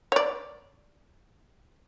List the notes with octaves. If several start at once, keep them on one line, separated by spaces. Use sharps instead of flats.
C#5 D5